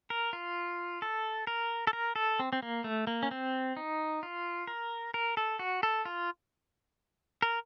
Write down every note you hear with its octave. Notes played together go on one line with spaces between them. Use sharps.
A#4
F4
A4
A#4
A4
A#4
A4
C4
C4
A#3
A3
A#3
C#4
C4
D#4
F4
A#4
A#4
A4
F#4
A4
F4
A#4